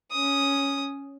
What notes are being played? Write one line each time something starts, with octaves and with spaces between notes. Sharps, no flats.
C#4 D#6